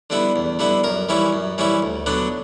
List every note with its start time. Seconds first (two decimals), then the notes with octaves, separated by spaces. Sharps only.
0.10 D3 G3 B3 E4
0.36 E2
0.59 D3 G3 B3 E4
0.84 F#2 A#4
1.09 E3 G3 C#4 E4
1.33 F#2
1.58 E3 G3 C#4 E4
1.82 D2
2.06 D3 F#3 B3 D4